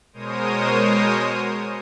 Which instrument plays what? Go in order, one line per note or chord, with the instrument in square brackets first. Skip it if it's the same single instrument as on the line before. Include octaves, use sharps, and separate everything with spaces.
[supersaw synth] B2 G#3 A#4 C5 C#5 D#6